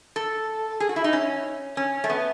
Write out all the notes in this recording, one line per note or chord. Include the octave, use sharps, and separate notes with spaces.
A4
G#4
F#4
E4
D#4
C#4
C#4
A3
B3